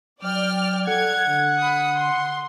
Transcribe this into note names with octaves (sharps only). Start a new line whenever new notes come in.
F#3 D5 G5 F6
A4 F#5 G#6
D3
B5 D#6
C6